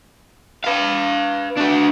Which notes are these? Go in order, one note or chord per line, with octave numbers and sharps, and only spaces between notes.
B4 F5
D4 F#4